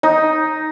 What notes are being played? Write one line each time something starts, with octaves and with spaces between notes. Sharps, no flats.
D#4